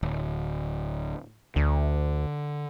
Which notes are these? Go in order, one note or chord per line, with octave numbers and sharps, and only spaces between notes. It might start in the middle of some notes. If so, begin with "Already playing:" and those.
D1
D2 D3